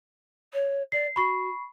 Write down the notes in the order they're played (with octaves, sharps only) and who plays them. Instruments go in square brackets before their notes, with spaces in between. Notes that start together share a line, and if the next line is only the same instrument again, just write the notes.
[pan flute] C#5
[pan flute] D5 [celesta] C7
[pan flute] F#4 [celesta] B5 C#6 C7